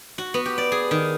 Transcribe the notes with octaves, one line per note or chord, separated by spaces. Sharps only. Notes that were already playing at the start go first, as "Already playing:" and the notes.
F#4
B3
G4
D5
G#4
D#3